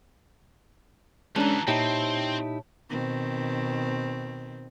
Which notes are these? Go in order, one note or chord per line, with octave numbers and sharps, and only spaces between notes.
D2 E3 G#3 C#4 D4 A5 A#5
A#2 C4 D#4 E4 G4 C#5 A5
B2 D#3 C4